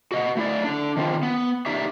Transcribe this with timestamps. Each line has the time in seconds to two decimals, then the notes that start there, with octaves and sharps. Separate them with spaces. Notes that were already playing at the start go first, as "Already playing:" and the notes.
0.12 F#4 D#5 F#5
0.37 A3 E4 D5
0.64 D3 D4
0.97 D#3 C4 F4
1.23 B3
1.66 D4 D#4 G4 E5